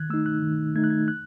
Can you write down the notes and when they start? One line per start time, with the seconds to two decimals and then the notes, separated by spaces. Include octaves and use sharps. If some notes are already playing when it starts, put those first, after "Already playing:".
Already playing: D#3 F#6 G#6
0.10 A3 D#4 E6
0.26 F#6
0.42 D#3
0.76 A3 D#4 G#6
0.84 F#6
0.90 G#6
1.08 F#6